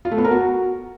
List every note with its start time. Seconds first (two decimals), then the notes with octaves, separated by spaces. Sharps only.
0.05 F4
0.11 A3
0.18 B3
0.25 A#4
0.31 F#4